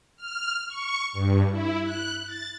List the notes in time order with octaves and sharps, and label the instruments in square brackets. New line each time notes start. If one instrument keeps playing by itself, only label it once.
[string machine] F6
C#6
G2
E4
F#6
A6